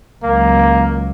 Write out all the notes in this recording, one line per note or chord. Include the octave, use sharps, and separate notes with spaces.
C#2 F#3 A#3